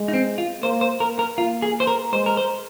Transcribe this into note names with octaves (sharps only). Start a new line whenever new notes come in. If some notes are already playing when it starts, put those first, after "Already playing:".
Already playing: G#3
D#4
C4
F4
A#3 C5
C5
A#3 A#4
A#4
A#3 F4
G#4
C5
A#4
G#3 C5
A#4
C5